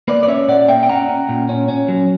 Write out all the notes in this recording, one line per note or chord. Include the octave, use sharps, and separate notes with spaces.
A#3 B4 D5
D5
C#4 C#5 E5
A#2 D5 F#5
A#3 E5 G5
G5
C#4 F#5 A#5
C#4
A#2
C#4
C#4
F#3